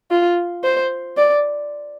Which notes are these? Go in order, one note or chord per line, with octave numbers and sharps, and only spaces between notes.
F4
C5
D5